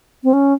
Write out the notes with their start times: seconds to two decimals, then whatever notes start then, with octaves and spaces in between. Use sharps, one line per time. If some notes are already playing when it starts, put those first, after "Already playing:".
0.24 C4
0.33 C#4